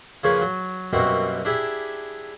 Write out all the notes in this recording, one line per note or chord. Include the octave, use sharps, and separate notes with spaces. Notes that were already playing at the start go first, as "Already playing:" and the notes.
C#3 F3 A#3 C#4 G#4 B4
F#3
F#2 B2 G3 A#3 C4 F#4
D4 E4 G4 G#4 E5